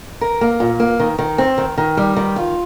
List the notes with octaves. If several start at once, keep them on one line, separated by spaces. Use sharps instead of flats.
A#4
A#3
A#2
A#3
D#3
D#3
C4
D#3
D#3
G3
D#3
F4